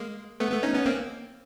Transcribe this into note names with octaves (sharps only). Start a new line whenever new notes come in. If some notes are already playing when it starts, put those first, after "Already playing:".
Already playing: G#3 A#3
A3 B3
A3 B3
C#4 D#4
B3 C#4
A#3 C4